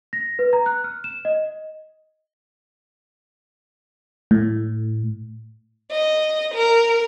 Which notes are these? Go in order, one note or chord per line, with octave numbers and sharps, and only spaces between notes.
A#6
B4
A#5
F#6
F6
E7
D#5
A2
D#5
A#4